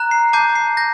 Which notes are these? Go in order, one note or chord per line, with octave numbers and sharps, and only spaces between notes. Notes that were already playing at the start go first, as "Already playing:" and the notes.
Already playing: A#5 F#6
C7
A5 D6 G6 C7
C7
G6 A#6